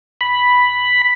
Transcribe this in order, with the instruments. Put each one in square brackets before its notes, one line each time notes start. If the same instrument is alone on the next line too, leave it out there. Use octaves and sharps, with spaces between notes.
[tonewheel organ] B5